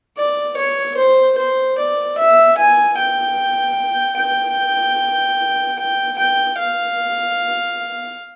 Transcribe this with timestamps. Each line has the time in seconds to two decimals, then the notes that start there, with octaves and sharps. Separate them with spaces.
0.18 D5
0.58 C#5
0.97 C5
1.38 C5
1.78 D5
2.18 E5
2.58 G#5
2.98 G5
4.18 G5
5.79 G5
6.19 G5
6.59 F5